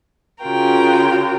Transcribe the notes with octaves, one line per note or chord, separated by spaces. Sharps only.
C#3 F4 F#4 A#4 G5